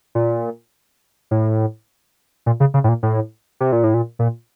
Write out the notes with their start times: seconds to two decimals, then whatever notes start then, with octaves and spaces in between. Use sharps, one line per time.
0.15 A#2
1.31 A2
2.46 A#2
2.60 C#3
2.74 C#3
2.84 A2
2.89 A#2
3.03 A2
3.60 C3
3.72 A#2
3.83 A2
3.94 A#2
4.19 A#2